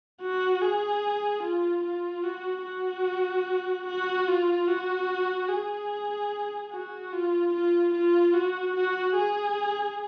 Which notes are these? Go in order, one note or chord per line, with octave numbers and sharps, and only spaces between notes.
F#4
G#4
F4
F4
F#4
F#4
F#4
F4
F#4
G#4
F#4
F4
F4
F4
F#4
F#4
G#4